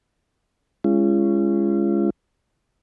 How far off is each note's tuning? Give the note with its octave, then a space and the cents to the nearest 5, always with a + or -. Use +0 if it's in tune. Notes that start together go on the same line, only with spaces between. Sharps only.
G#3 -10 C#4 +5 F4 -40